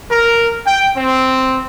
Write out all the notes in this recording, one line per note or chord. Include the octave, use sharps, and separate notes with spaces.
A#4
G5
C4